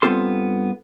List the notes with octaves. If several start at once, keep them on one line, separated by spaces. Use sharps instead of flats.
G2 B3 C4 F4 A4 C6